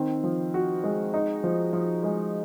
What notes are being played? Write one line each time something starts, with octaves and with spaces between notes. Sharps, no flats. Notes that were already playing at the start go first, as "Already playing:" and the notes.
Already playing: D#3 C4
F3
F#4
G#3
D#4
F3
F3
G#3